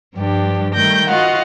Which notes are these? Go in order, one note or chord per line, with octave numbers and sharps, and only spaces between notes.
G2 F3 G3 D4 G4
D#3 G3 A3 G5 G6 A#6
F4 F#4 D#5 F5 F#5